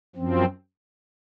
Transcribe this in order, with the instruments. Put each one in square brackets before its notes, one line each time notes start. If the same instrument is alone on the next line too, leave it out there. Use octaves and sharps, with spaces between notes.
[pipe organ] F#2 F3 C4